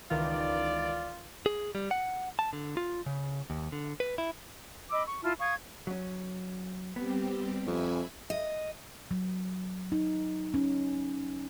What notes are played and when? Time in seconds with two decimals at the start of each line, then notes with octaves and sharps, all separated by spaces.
0.11 C#2 D#3 E3 F4 D5
1.46 G#4
1.75 G3
1.91 F#5
2.39 A5
2.53 D3
2.77 F4
3.06 C#3
3.50 D#2
3.72 D3
4.00 B4
4.18 E4
4.91 D#5 B5 D6 E6
5.07 C#6
5.23 E4 F4 A5 F6
5.39 F5 C#6 D#6 G#6
5.87 F#3 C#4
6.96 G3 B3 C4 G4
7.67 F2 E5 G#5 B5
8.30 D#5
9.11 F#3
9.92 D#4
10.54 C#4